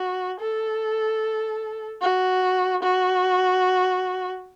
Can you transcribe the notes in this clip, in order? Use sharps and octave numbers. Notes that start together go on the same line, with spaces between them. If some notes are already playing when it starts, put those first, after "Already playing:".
Already playing: F#4
A4
F#4
F#4